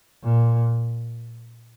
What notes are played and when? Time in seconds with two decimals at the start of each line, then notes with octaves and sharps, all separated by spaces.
0.24 A#2